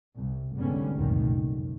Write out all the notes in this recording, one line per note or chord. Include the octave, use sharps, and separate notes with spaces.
C2
F1 G#2 D3 G3 B3 C#4
F1 C#2 F#2 A#2 D#3 G3
F#1